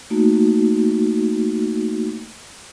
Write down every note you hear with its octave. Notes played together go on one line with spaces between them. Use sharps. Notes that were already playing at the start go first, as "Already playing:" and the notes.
A3 A#3 D#4 F#4